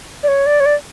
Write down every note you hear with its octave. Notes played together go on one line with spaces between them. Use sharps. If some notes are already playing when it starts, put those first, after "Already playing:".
D5
C#5
D5
C#5
D5